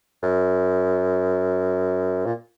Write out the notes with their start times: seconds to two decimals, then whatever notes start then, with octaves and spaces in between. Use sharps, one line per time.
0.23 F#2
2.26 A#2